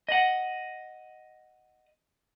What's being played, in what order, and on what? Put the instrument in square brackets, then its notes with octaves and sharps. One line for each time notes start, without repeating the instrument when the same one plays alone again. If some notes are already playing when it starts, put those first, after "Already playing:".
[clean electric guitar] D#5 F#5